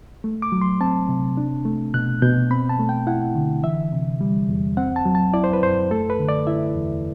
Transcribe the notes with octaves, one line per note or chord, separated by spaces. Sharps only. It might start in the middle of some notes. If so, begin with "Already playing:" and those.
A3
D6
F#3
C6
C4 A5
C3
D4
A3
B2 F#6
B2 G6
C4 B5
A5
A3
G5
E4 F#5
D3
E3 E5
C3
G3
E2
C4 F#5
A5
F#3
A5
E4 D5
C5
B4
F#2 C5
A3 A4
B4
D3
D5
E4 E5
E2